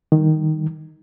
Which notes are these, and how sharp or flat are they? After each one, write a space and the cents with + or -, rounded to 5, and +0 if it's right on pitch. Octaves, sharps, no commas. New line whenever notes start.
D#3 +0 G3 +0